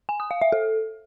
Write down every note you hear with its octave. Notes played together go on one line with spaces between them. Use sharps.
G#5
D#6
F5
E5
A4